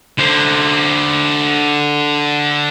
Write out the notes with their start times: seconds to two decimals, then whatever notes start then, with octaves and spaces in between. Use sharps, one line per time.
0.18 D3 C5